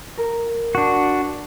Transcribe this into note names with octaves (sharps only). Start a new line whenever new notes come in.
A#4
D4 F#4